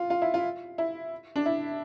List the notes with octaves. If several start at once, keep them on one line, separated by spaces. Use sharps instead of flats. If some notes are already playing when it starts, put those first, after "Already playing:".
Already playing: F4
F4
E4
F4
E4
D4
E4